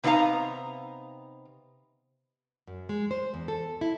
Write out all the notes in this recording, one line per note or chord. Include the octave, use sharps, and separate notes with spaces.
C3 B3 D#4 C#5 F5 A#5
F#2
G#3
C5
E2
A4
E4